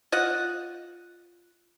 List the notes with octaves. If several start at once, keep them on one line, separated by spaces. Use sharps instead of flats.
F4 D#5 F#5